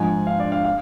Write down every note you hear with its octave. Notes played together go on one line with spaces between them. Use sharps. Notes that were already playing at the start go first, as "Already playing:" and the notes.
Already playing: G#2 F3 G#5
F5
D5
F5
F5